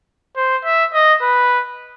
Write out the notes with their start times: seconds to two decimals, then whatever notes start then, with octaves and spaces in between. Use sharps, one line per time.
0.36 C5
0.65 E5
0.94 D#5
1.22 B4